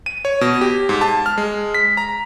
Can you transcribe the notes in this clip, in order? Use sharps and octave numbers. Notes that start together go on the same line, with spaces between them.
D#7
C#5
B2
G4
G#2
A5
F6
G#3
B6
A#5